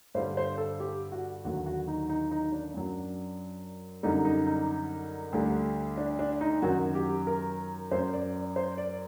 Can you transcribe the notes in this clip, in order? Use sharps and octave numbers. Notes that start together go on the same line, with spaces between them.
G2 D3 G3 C5
C5
A4
G4
F#4
D#2 D3 F#3 F#4
F#4
D#4
D#4
D#4
D4
F#2 F#3
F#2 D3 G3 D#4
D#4
D#4
D2 D3 G3
D4
D4
D#4
F#2 D#3 F#3 F#4
G4
A#4
F#2 F#3 C5
D5
D5
C5
D5